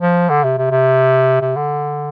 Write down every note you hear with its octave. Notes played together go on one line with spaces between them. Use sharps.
F3
D3
C3
C3
C3
C3
D3